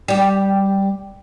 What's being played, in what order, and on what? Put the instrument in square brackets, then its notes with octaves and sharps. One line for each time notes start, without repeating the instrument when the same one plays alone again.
[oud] G3 G4